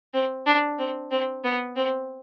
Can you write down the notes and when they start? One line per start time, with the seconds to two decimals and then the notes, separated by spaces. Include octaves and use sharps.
0.14 C4
0.46 D4
0.79 C4
1.11 C4
1.44 B3
1.77 C4